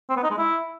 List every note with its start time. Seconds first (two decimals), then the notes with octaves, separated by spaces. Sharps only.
0.09 C4
0.16 B3
0.24 D#4
0.31 G#3
0.38 E4